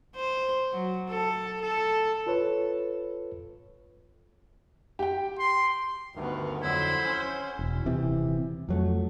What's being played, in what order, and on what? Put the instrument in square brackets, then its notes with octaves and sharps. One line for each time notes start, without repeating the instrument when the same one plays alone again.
[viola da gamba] C5
F#3
A4
A4
[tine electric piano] F4 A4 B4 C#5
[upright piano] G4 G5
[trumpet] C6
[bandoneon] D2 G2 D#3 [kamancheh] B3 A#4
[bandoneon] F2 D3 F#3 [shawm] E4 [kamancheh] C5 F#5
[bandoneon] C#4
[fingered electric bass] E1
D#1 C3 E3
F2 F#3 A3